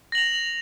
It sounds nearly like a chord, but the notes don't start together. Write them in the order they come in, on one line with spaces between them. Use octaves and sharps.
A#6 F#7 F7